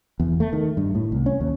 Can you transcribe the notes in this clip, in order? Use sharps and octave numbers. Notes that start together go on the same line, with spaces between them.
E2
A3
D#3
G2
A2
C2
C#4
D#2